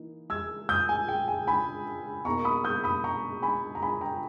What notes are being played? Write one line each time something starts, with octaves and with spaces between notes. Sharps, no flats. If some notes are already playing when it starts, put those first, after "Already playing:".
Already playing: E3 A#3 D#4
E6 G#6
D#6 G6
G#5
G5
G#5
G#5 B5
B2 A#3 D#4 A#5 C#6
B5 D#6
D#6 G6
B5 D#6
A#5 C#6
G#5 B5
A#5
G#5 B5
G5 A#5